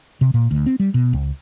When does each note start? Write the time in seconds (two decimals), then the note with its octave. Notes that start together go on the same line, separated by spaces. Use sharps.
0.21 C3
0.34 A#2
0.51 D2
0.66 C4
0.80 G3
0.94 B2
1.13 C#2